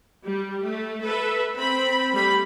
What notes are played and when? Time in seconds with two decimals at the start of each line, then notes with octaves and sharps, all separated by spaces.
0.24 G3
0.63 A3
1.03 A4 B4 E5
1.56 C4 B5
2.14 G3 A3 B5